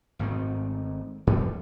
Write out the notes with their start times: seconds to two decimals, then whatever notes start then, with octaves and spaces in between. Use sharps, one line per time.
0.19 G#1 G#2 A3 C4
1.27 G2 E3 G3 A3